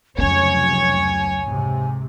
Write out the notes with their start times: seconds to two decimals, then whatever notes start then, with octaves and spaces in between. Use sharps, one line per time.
0.18 F1 C#2 F#3 C#4 C#5 G#5
1.45 G#2 C3